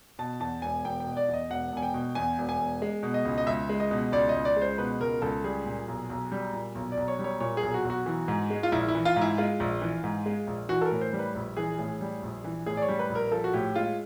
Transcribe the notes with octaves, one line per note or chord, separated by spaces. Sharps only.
B2 A5
E2 A5
E1 G#5
E1 G5
G5
B2
D5
E2
D#5
E1 F#5
E1 G#5
G5
B2
E2 G#5
E1
G#5
E1
G#3
B2
D#5
C#2
D#5
C#2 E5
G#3
D#5
B2
C#2 D5
D#5
C#2
D5
G#3
C5
B2 B4
C#2 A#4
C#2 A4
G3 G#4
A#2
B1
B1
G3
A#2
B1
D5
B1
C#5
G3
C#5
A#2 C#5
G#4
B1
F#4
B1
F#4
E3
G#2
G#3
F4
A#1 E4
E4
E3
F4
G#2
E4
G#3 F4
A#1
E3
G#2
G#3
A#1
E3 F#4
A4
A#4
A2
C5
G3
B4
A#1
E3 G#4
A2 G#4
G3
A#1
E3
A2 G#4
D5
C#5
G3
B4
A#1
A#4
F3 A4
F#4
A2 G4
G#3 F4